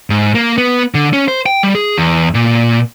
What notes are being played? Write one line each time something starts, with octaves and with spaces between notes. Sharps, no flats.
G#2
A#3
B3
D3
C#4
C5
G5
G3
G#4
E2
A#2